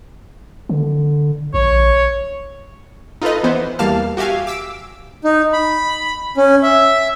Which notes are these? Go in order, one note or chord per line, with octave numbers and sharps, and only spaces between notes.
D3
A#1 C#5
D#4 F4 A4 B4 D#5
E3 B3 C5
E2 G3 A#3 F5 A5 F6
F#4 G4 E5 F5 G#5
D6 E6 B6 D7
D#4
B5
C#4
E5